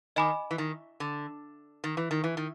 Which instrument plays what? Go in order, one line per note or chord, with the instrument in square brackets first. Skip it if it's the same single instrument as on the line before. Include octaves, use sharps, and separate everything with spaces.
[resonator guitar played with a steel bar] D#3 [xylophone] D#5 G#5 B5 D6
[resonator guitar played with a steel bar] E3
D#3
D3
D#3
E3
D#3
E3
D#3